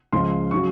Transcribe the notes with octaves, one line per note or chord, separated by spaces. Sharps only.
C#2 C#3 F3 C6
C#3 F#3 C#6